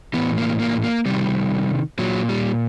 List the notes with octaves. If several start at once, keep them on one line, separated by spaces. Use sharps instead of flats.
A2 E3 B3
A#3
A#3
A#3
C3 D#3 G3
A#2 F#3
G3